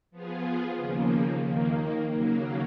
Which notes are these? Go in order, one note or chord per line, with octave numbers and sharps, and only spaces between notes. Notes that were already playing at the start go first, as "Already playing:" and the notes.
F3 B3 F4 G#4
D#2 C#3 F3 A#3
D#2 D#3 A#3
D#2 C#3 F#3 A#3